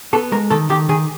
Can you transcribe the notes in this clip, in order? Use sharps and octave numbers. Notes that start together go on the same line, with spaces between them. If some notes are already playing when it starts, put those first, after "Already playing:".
B3 A4
G#3 A#4
D#3 A4
D#3 G4
D#3 G#4